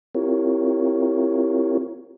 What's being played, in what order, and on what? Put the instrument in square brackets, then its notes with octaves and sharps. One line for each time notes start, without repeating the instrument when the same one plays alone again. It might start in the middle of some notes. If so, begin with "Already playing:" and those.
[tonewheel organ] C4 E4 F4 G4 A#4 C#5